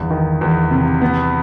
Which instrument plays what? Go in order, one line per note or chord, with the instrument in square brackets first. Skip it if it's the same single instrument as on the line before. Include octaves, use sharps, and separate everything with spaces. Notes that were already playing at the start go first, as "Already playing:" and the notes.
Already playing: [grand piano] G1 E2
D#3
E2
C3
B3